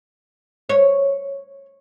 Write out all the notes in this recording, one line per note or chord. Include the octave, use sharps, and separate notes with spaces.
C#5